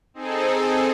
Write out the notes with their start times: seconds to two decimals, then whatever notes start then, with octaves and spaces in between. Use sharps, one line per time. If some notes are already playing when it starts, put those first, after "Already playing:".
0.14 C4 D#4 G#4 A4